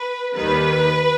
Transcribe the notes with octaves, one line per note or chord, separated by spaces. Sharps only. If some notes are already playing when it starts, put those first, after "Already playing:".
Already playing: B4
D#2 D#3 G3 B4